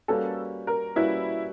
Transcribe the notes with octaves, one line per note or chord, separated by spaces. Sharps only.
G3 A#3 C#4 F#4 A4 B4
A#4
G3 A#3 C#4 E4 F#4 B4